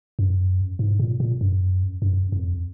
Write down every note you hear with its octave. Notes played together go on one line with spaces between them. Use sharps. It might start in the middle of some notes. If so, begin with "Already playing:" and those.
F#2
G#2
A#2
A#2
F#2
F#2
F2